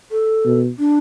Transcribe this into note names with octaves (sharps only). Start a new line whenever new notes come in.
A4
B2
D4